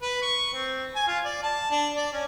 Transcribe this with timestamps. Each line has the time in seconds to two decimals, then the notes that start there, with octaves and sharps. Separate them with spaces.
0.02 B4
0.22 C#6
0.54 C4
0.96 G#5
1.08 F4
1.25 D5
1.43 A5
1.71 D4
1.96 D5
2.13 C#4